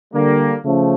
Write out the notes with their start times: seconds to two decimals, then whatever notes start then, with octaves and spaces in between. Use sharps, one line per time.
0.14 D3 G3 A#3
0.65 C#3 F3 A3 C#4